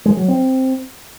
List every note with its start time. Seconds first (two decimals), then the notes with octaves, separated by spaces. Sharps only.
0.06 G#3
0.17 F#3
0.28 C4